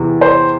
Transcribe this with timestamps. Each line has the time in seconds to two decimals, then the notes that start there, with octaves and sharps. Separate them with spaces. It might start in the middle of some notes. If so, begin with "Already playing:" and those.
Already playing: E2 C3 E3
0.21 C5